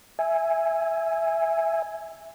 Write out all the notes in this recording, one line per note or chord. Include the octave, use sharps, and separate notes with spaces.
E5 G#5